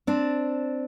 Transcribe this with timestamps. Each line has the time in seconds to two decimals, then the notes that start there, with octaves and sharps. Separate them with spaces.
0.07 C4 D4